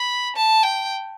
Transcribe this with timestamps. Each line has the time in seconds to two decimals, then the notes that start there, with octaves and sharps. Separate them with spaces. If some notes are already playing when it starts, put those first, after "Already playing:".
Already playing: B5
0.36 A5
0.63 G5